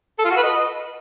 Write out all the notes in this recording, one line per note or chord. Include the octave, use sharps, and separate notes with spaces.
A4
F4
F#4
B4
D#5